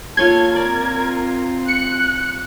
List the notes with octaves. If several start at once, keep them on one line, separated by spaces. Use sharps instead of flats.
A#3 F4 A4 C#5 C6 G#6
C4 F4 A#4 D5
F#6 C#7